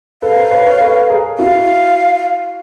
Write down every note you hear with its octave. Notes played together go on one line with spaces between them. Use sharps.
A4 B4 F5
A#4 C5
B4 C#5
B4 C#5
A4 B4
G#4 A#4
E4 F#4 F5